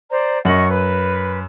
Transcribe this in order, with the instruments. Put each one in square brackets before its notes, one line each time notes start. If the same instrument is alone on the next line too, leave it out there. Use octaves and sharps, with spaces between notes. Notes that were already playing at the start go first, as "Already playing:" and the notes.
[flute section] C5 D5 A#5
[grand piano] F#2 F#7 [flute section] D#5 F#5 C#6
[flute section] B4